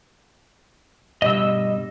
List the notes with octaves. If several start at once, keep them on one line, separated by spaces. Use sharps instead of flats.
G2 B2 G3 D#5 E6